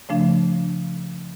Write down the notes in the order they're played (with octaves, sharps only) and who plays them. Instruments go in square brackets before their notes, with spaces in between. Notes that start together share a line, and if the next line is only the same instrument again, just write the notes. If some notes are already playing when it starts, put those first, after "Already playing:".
[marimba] C#3 F3 A3 D4